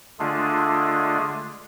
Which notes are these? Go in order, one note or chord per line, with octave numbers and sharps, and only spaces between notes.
D3 G#3 A3 D4 F4 G#4